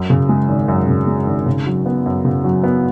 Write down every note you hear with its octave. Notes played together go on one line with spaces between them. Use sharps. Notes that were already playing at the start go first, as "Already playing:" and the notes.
Already playing: F#2
C#3
G#3
G#1
F#2
C#3
G#3
G#1
C#3
F#3
B3
F#2
C#3
F#3
B3